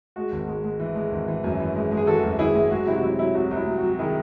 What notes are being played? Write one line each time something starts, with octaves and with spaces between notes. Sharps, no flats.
G#3 F#4
G#1
G#3
G#3
E3
G#3
G#1
E3
F#2
E3
G#3
G#3
G#4
E3 F#4 A4
F#2
G#1 E4 G#4
G#3
F#3 F#4
C3 E4
F#4
F#3 E4
F#3 E4
C2 F#4
C2
E4
F#3
F#4
F#3
D#3 E4 G#4